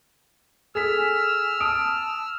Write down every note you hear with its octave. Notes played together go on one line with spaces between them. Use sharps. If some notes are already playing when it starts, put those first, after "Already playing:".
G#4 A4 E6 F6 B6
G#5
A5 D#6 D7